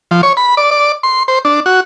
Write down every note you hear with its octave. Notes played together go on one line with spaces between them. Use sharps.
F3
C#5
B5
D5
D5
C6
C5
D4
F#4